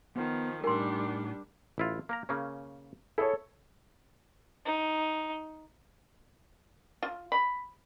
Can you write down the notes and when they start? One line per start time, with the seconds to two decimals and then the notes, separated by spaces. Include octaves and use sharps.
0.16 D#3 F3 B3 B4
0.64 A2 G3 D4 D#4 A#4 G#5 C6
1.78 A1 E4 F4
2.09 A#3 A#4 A#5
2.29 C#3 A#3 C#4
3.18 E4 G#4 A4 C#5
4.66 D#4
7.03 F4
7.32 B5